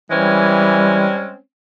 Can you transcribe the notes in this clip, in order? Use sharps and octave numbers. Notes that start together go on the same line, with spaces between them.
E3 G3 G#3 C4 C#4